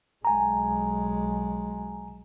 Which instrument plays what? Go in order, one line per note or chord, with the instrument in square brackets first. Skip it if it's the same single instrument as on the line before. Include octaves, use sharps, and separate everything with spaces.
[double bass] B1 G#3 [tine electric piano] G#5 A#5